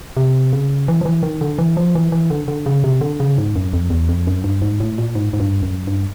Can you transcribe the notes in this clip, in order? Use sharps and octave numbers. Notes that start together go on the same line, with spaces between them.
C3
C#3
E3
F3
E3
D#3
D3
E3
F3
E3
E3
D3
D3
C#3
C3
D3
C#3
G#2
F#2
F2
E2
F2
F#2
G2
G#2
A2
A#2
G#2
G#2
G2
F#2
G2